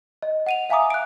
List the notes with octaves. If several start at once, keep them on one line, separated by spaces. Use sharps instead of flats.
D#5
F#5 D#7 F7
E5 F5 G#5 A#5 D6 D#6
F#6 D7